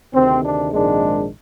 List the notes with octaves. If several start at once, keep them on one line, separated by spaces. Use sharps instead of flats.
D2 C3 D#3 C4
D4
A#1 G#2 D#3 G#3 C4 D4